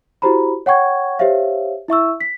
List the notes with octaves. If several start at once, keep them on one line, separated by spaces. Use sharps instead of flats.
E4 F#4 G4 C5 A#5 B5
C#5 F#5 G5 C#6 G#6
G4 C5 C#5 E5 F5
E4 E5 C#6 E6
B6